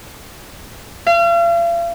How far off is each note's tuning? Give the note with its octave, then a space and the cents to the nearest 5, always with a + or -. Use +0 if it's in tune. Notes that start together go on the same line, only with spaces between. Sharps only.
F5 -40